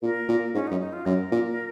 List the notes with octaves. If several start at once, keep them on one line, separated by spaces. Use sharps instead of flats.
A#2 A#4
A#2
G#2 C#4
D#4
F#2
D#4
F4
F#2 A#4
A#2